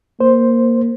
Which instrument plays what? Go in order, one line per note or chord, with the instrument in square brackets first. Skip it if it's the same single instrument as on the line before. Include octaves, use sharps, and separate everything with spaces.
[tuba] A#3 [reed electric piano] C5